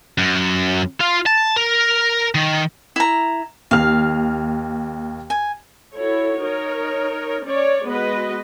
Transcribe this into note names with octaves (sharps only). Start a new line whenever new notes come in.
F#2
F4
A5
A#4
D#3
E4 A#5
D#2 F5 F6
G#5
E4 F#4 A4 C#5
D#4 A#4 C#5
C#4 C#5 D5
G#3 B3 F#4 B4 D#5